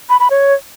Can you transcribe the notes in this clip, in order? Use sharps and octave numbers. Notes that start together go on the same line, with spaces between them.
B5
B5
C#5